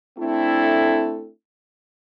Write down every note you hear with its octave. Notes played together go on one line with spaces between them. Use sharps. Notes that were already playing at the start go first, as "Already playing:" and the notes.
A3 C4 D4 E4 A4